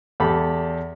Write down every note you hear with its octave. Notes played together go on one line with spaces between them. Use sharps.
E2 G4 A4 B5